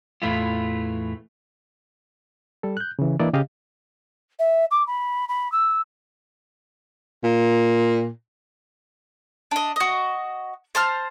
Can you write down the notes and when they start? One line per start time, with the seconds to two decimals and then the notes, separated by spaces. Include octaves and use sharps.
0.22 E2 A2 E3 A3 E4 F4
2.63 G3 A4
2.77 F#6 G6
2.99 C#3 E3
3.19 E3 A#3 D4 E4 D5 D#5
3.33 C#3 G4 D#5 F5
4.39 E5
4.71 D6
4.87 B5
5.28 B5
5.52 E6
7.24 A#2
9.51 D4 D#5
9.76 F#4 D#5
10.75 C5 A5 F6